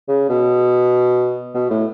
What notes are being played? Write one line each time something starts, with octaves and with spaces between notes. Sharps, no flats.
C#3
B2
B2
A2